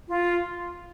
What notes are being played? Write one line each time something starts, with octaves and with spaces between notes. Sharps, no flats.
F4